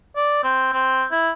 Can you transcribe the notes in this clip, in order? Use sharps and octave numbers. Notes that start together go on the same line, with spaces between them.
D5
C4
C4
E4